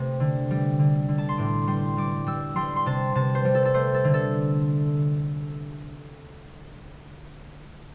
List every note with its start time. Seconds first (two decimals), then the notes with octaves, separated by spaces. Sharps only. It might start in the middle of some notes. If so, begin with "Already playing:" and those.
Already playing: C3 A3
0.20 D3
0.51 G3
0.79 D3
1.09 D3
1.18 A5
1.29 C6
1.38 A2 D6
1.67 G3 C6
1.97 G3 D6
2.27 G3 E6
2.56 G3 C6
2.76 C6
2.86 C3 A5
3.15 C3 A5
3.35 C5
3.45 G3
3.55 A4
3.65 A4
3.74 A3 C5
3.94 A4
4.04 D3
4.14 A4